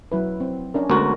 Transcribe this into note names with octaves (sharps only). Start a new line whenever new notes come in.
F#3 E4 B4
C4
C#4 D4 A#4
D2 G#3 B3 F#4 A#4